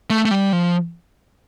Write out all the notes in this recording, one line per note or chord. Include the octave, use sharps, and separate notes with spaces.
A3
A3
G3
F3